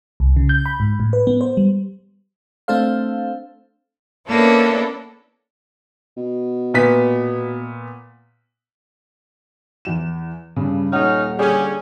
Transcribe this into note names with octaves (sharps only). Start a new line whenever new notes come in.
C2
C#3
G6
B5
G#2
A2
B4
B3
C5
G3
A3 C4 D4 A4 C5 F5
A#3 B3 C#4 D4 E4 A4
B2
A#2 B3 B6
E2 E7
G2 C#3
D#1 C#4 D#4 F#5 F6
D3 G3 C#4 G#4